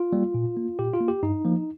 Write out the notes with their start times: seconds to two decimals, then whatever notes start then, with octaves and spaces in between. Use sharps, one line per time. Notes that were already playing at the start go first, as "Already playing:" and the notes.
Already playing: F4
0.13 G3 A#3
0.34 A#2
0.57 A#3
0.79 A#2 G4
0.94 F4
1.00 A#3
1.08 G4
1.23 G2 D#4
1.44 F3 A#3